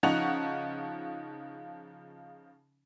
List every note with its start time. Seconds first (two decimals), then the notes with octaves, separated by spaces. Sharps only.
0.03 C#3 F3 D#4 F#5 C#6 F7